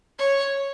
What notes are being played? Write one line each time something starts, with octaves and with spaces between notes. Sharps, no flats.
C#5